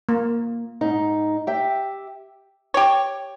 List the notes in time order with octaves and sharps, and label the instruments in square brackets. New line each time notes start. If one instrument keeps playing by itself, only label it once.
[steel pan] A#3
[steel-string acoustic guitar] G#2 D#4
G4 E5 G5
[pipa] G4 C#5